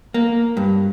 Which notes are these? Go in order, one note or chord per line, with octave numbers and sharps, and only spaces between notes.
A#3
G2